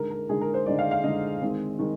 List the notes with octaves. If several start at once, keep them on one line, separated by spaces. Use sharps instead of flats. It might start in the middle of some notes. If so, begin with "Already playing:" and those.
Already playing: D3 G#3 D#4 A#4
A#4
D3 G#3 D#4 G#4
A#4
C5
D3 G#3 D#4 D5
F5
F5
D3 G#3 D#4 D#5
D#3 G#3 C4
D#3 G#3